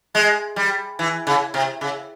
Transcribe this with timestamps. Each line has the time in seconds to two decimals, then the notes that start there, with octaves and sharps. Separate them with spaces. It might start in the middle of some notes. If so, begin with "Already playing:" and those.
0.15 G#3
0.56 G3
0.99 E3
1.27 C#3
1.54 C3
1.81 C#3